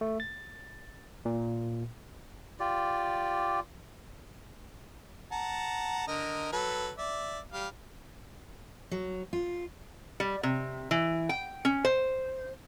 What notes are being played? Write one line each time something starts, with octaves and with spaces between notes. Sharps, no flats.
A3
A6
A#2
F4 G4 D5
F#5 A5 A#5
D3 A#4 D#5
F#3 A4 B4
D5 E5
G3 F5
F#3
F4
G3
C3
E3
G5
C#4
C5